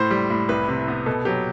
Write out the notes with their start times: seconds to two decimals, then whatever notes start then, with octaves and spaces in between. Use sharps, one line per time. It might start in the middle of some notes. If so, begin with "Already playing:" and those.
Already playing: A2 C5
0.11 G3
0.30 A2
0.49 C2 B4
0.68 C3
0.88 B3
1.06 B2 A4
1.25 F#3 G4